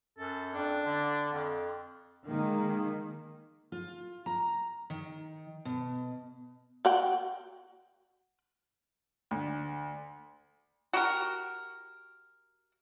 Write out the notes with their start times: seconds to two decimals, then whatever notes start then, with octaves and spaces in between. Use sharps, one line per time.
0.18 F#2 A4
0.54 F2 D4
0.85 D3
1.33 F2
2.26 D#3 G#3 A#3
3.72 F4
4.26 A#5
4.90 D#3
5.65 B2
6.85 F#4 F#5 G5
9.31 D2
10.93 F#4 G4 A#4